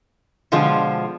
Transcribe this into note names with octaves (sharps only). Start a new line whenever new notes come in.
B2 D3 F3 G#3 F4